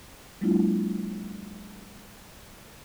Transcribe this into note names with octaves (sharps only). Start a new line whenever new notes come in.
F#3 G#3 A#3 D4 E4 F4